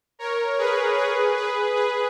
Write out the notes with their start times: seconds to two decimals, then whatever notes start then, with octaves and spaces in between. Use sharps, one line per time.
0.19 A#4 C#5
0.58 G#4 B4
0.97 G#4 B4
1.37 G#4 B4
1.76 G#4 B4